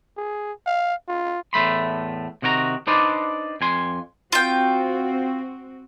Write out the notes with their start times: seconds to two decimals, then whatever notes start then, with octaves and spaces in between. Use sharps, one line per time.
0.17 G#4
0.67 F5
1.08 F4
1.53 E2 A2 A3 B5 C6
2.42 C3 D#3 F#4 C#5 A#5
2.87 D4 D#4 B4 C5 D5
3.61 F2 G#5 C6
4.32 C4 F4 F#4 G5